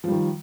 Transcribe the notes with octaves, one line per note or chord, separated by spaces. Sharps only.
D#3 F3 G3